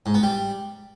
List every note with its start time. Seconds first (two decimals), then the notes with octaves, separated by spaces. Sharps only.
0.06 G#2
0.14 B3
0.23 G3